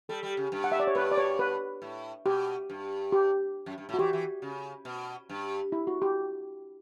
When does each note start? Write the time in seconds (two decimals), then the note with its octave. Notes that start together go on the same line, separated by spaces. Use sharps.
0.09 G3 A4
0.23 G3
0.37 C#3
0.52 G2
0.64 F#5
0.72 E5
0.80 D5
0.87 C#5
0.95 G2 B4
1.12 D5
1.17 C#5
1.39 B4
1.82 A2
2.25 B2 G4
2.70 G2
3.12 G4
3.66 F#2
3.78 G2
3.89 A2
3.94 F#4
3.99 E3 G4
4.13 E3
4.42 C#3
4.85 B2
5.30 G2
5.72 E4
5.87 F#4
6.02 G4